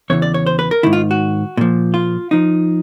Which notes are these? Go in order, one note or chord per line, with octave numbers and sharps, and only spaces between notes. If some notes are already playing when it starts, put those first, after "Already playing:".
E2 C#3 E3 C#5
D5
C#5
C5
B4
A#4
G#2 D#3 E4
F4
F#4
A#2 F3
F4
F3 D#4